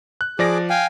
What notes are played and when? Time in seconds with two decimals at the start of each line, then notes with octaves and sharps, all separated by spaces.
0.21 F#6
0.39 F3 G#4 D5 D6 A#6
0.70 F5 G5 G#5